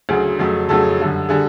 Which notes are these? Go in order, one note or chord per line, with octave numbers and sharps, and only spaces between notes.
D2 C#3 F#3 G#4
F2 C#3 F#3 A3
F2 C#3 F#3 A3 A4
F#2 D3 G3
D3 G3 G#4